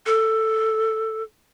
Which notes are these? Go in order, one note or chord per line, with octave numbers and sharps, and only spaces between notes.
A4